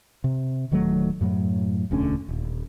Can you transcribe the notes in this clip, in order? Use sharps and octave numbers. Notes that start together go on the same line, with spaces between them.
C3
D1 D#3 F#3 A3
F#2 A2 F#3
E1 D2 D3 C#4
D#1